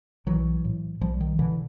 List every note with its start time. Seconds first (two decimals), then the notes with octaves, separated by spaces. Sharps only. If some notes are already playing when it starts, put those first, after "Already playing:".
0.26 B1 E3 F#3
0.65 A2
1.01 B1 F3 G3
1.20 D#3
1.39 B2 D3 E3